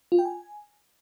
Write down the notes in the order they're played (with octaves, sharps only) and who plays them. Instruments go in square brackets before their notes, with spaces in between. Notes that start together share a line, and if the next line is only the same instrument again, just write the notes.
[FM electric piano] F4
G5
G#5